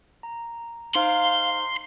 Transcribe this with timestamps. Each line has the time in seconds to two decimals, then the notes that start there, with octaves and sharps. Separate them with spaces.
0.23 A#5
0.95 D#4 C5 F5 C6